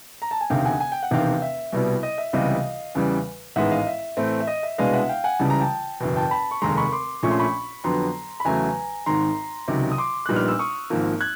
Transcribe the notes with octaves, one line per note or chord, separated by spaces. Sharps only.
A#5
A5
G#5
E1 D2 C3 D#3 F5 G5
F#5 G#5
G#5
G5
F#5
E1 E2 C3 D#3 F5 G5
E5
C2 B2 G3 B3 E4
D#5
E5
C#2 C3 E3 G3 B3 D#5 F5
E2 C#3 E3 G3
A1 G#2 D#3 G#3 B3 E5 F#5
D#5 F5
E5
A2 E3 A3 C4
E5
D#5
E5
C2 B2 G#3 B3 D4 D#5 F5
E5 F#5
F5 G5
F#5 G#5
C#2 C#3 E3 G3 A5
A#5
G5 A5
F#1 E2 B2
G5 A5
A5 B5
C#6
F1 D#2 D#3 G#3 A#5 C6
B5 C#6
C6 D6
A#1 A#2 F3 A3 C#4 C#6
C6
B5 C#6
F2 D3 F#3 B3 A#5 C6
B5
E2 C#3 F#3 A3 G#5 A#5
G#1 G#2 D#3 A#5 C6
C#2 C3 D#3 F#3
D#6
C6 D6
A#1 A#2 G3 B3 D#4 F#6
F6
E6
C#6 D#6
G#1 G#2 F3 A#3
F#6 G#6